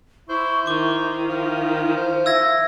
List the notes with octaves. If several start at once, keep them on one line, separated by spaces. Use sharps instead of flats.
E4 C5 C#6
D#3 E4 C#6 D6
F3 E4
C5
F3 E5 E6 G#6 A#6